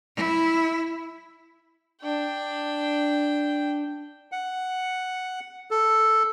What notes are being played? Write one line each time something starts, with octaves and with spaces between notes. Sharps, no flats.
E4
D4 G5
F#5
A4